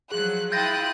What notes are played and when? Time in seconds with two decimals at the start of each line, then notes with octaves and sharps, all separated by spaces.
0.12 F3 F#3 G#4 F#6
0.52 E4 F4 G5 D#6 F#6 G6 A6 A#6